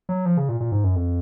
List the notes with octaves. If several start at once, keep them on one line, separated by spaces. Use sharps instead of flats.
F#3
F3
C#3
A#2
A#2
G#2
F#2
F2